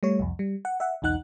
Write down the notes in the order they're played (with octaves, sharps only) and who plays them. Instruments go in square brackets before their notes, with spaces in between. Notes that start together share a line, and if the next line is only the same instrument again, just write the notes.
[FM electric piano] G3 A3 C#5
C2 F2
G3
F#5
E5 F#5
B1 E2 D#4 F#5 F#6